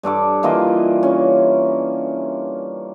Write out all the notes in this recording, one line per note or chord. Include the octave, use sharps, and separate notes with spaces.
G2 D4 A4 D6
E3 A#3 F4 D#5
C#4